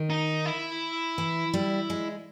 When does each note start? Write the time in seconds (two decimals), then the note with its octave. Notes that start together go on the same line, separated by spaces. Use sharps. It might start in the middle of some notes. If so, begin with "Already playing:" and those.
Already playing: D#3
0.10 D#4
0.45 E4
1.18 E3
1.54 G3
1.90 G#3